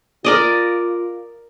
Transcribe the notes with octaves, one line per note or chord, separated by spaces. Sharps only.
F4 A#4 D5 D#5